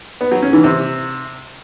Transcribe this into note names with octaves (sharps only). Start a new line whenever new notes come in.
B3
F#3
C#4
E3
C3